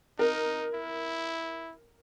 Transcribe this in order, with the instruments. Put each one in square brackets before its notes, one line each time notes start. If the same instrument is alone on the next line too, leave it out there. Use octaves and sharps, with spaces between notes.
[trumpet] D#4 [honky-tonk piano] A#4
[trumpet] E4